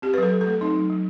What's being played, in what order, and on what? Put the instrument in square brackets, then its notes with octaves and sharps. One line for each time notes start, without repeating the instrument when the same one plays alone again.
[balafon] C4 G4
B4
F#3
A4
F#3
A4
A3
C4 D#4
F#3
F#3